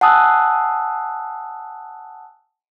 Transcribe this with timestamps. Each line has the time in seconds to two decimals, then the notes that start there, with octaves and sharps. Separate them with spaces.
0.01 F#5 G#5 A5 D#6 E6 F#6